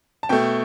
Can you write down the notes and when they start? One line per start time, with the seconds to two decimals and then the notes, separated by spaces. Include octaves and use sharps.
0.23 A5
0.29 B2 A3 G5